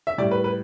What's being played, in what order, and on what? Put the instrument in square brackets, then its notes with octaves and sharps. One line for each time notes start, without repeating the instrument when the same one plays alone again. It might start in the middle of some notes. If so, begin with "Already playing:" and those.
[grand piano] E5
A2 G3 D5
B4
B4